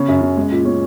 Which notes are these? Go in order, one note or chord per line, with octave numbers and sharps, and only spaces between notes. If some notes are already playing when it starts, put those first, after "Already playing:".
Already playing: C#3 C#4
F#2
C#3
G#3
A#2
C#4